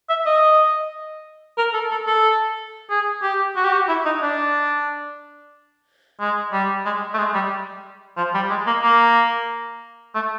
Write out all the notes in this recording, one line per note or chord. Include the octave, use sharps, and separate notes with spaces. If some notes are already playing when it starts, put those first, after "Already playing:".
E5
D#5
A#4
A4
A4
A4
G#4
G4
F#4
G4
F#4
E4
D#4
D4
G#3
G3
G#3
A3
G#3
G3
F3
G3
G#3
A#3
A#3
A3